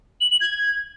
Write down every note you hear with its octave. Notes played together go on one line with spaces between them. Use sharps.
F#7
F#7
G#6